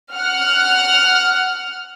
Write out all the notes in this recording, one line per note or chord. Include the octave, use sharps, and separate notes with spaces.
F#5 F6